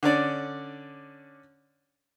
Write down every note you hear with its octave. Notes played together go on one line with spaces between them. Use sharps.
D3 C#4 D5